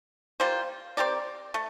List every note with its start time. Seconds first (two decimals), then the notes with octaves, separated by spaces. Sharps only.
0.40 G3 A#3 F4 C5
0.97 C4 G4 A#4 D5
1.54 A3